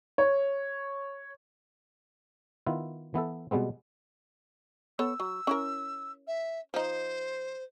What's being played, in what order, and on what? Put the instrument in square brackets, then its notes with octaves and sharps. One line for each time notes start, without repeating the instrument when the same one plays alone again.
[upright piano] C#5
[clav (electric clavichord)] D#3 B3 E4 F4
E3 B3 E4 A4
B2 G3 G#3 B3 C4
[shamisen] B3 A4 C#5 [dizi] E6
[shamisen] F#3
C#4 E4 A#4
[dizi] E5
[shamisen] F3 D#4 [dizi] C5